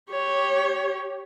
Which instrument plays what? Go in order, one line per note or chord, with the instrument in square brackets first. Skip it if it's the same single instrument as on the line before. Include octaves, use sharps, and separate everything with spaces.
[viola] G4 C#5